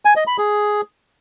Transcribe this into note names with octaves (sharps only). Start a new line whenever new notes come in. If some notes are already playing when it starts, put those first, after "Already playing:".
G#5
D#5
B5
G#4